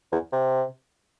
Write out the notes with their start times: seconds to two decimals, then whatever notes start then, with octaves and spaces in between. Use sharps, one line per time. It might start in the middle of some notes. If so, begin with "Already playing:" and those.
0.12 E2
0.33 C3